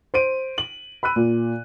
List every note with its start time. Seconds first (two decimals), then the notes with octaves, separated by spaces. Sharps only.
0.14 C5 D7 D#7
0.58 F#7
1.03 B5 E6 F#6 D#7
1.16 A#2